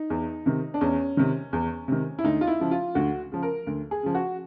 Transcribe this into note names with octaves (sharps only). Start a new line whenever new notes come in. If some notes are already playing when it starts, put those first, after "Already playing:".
Already playing: D#4
E2
C3 D#3
D4
E2 C#4
C3 D#3
E2
C3 D#3
E4
D2 D#4
F4
E4
C#3 F3
F4
D2 F#4
C#3 F3
A#4
D2
G#4
C#3 F3
F#4